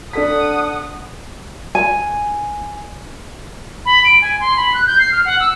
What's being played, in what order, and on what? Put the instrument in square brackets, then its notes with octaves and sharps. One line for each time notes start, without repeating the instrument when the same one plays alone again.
[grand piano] D4 A4 B6 [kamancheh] F#5 D#6
[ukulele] G#5
[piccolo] B5
D7
G#5
C6
B5
F#6
G6
C7
F6
F#5
E6